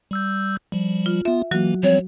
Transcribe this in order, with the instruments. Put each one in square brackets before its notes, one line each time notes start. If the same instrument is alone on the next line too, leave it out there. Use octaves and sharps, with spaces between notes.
[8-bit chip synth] G3 E6 G6
F3 G3
[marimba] F4
[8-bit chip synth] B3 F4 [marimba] E5
[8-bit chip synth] E3 A#3 [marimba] F#3 F#4
[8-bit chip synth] F3 G3 C4 [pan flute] C#5